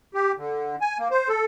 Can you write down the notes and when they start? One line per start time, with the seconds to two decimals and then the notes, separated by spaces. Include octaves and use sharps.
0.14 G4
0.37 D3
0.81 G#5
0.99 A#3
1.11 C5
1.29 A4